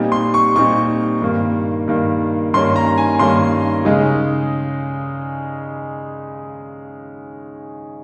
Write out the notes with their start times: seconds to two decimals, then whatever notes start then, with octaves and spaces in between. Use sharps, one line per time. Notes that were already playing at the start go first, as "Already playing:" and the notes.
Already playing: A#2 G3 C4 D#4
0.12 C6
0.34 C#6
0.56 A#2 G3 C4 D#4 C#6
1.22 G2 D#3 A#3
1.88 G2 D#3 A#3
2.54 G2 D#3 A#3 C#4 C6
2.76 A#5
2.98 G#5
3.19 G2 D#3 A#3 C#4 C6
3.85 C#3 G#3 D#4